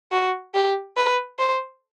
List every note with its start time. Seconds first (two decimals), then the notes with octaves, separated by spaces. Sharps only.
0.12 F#4
0.54 G4
0.97 B4
1.39 C5